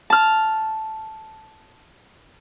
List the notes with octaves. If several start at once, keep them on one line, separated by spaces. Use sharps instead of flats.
A5 F6